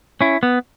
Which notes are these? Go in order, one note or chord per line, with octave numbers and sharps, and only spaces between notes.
C#4 E4
B3